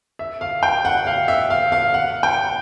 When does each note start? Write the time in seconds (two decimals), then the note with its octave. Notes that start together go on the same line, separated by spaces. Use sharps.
0.19 E5
0.41 F5
0.63 G5
0.85 F#5
1.07 F5
1.28 E5
1.50 F5
1.72 F5
1.94 F#5
2.23 G5